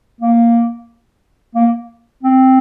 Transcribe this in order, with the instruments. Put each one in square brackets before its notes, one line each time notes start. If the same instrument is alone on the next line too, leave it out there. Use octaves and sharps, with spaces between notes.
[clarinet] A#3
A#3
C4